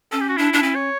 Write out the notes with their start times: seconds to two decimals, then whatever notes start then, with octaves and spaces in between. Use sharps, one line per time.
0.12 C#4 A4
0.20 G4
0.29 F#4
0.37 D4 E4
0.53 D4
0.63 C#4
0.75 C#5